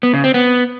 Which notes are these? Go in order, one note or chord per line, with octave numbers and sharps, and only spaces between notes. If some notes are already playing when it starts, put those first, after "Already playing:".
B3
C#3
C4
B3